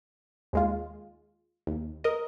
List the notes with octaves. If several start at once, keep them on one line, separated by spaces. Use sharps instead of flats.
D#2 G#3 F4
D#2
A#4 D#5